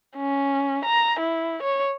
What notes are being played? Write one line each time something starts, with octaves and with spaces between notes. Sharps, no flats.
C#4
A#5
E4
C#5